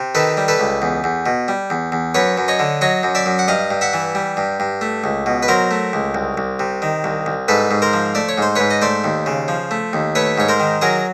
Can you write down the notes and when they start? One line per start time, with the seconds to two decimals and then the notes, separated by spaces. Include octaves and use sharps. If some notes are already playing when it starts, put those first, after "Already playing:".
Already playing: C3
0.15 D#3 A4 B4
0.37 G3
0.48 A4 B4
0.60 C#2
0.82 E2
1.04 E2
1.26 B2
1.48 G3
1.70 E2
1.92 E2
2.14 F#2 B4 C#5
2.38 F#2
2.48 C#5 D#5
2.59 D3
2.81 F#3 C#5 D#5
3.03 F#2
3.15 D5 E5
3.26 F#2
3.39 F#5
3.48 G2 D#5 F5
3.71 G2
3.81 E5 F#5
3.93 E3
4.15 G3
4.37 G2
4.60 G2
4.81 A3
5.04 C#2
5.26 B2
5.43 B4
5.48 F#3 A#4 C5
5.71 A3
5.93 C#2
6.15 C2
6.38 C2
6.59 C3
6.82 D#3
7.04 C2
7.26 C2
7.48 G#2 A4 B4
7.71 G#2
7.82 A#4 C5
7.93 F3
8.15 A3 D5
8.29 C#5
8.38 G#2 C5
8.55 G#2 B4 C#5
8.70 D#5
8.82 A3 C5 D5
9.04 D#2
9.26 C#3
9.48 F3
9.71 A3
9.93 D#2
10.15 A3 B4 C#5
10.38 G#2 C#5
10.48 A#4 C5
10.60 D#3
10.81 F#3 G#4 A#4